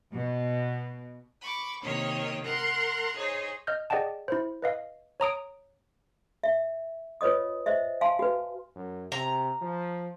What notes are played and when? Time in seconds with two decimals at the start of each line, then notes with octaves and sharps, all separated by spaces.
0.12 B2
1.42 B5 C#6 D6
1.82 C3 D#3 A#3 C#5 D#5
2.43 A#4 F#5 A#5 C6
3.16 D#4 G#4 C5 C#5
3.67 D#5 F6 G6
3.90 G#4 D5 D#5 F#5 G5 A5
4.28 E4 C5
4.62 B4 D#5 F5
5.20 C#5 A#5 D#6 D7
6.44 E5
7.21 F4 B4 C#5 D#5 D#6
7.66 C5 D#5 E5
8.01 F5 G#5 A5 C6
8.19 F#4 B4
8.76 F#2
9.12 C3 A#5
9.61 F3